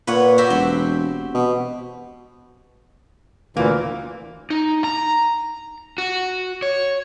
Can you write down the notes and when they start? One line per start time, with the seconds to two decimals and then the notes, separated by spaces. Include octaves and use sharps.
0.07 A#2 B4 C#5 F#5
0.38 F#4 G4 E5
0.50 E1 C4
1.35 B2
3.57 D2 A#2 E3 A#3
4.50 D#4
4.84 A#5
5.98 F#4
6.62 C#5